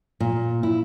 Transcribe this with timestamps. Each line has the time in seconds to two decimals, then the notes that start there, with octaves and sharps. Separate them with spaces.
0.20 A#2
0.63 E4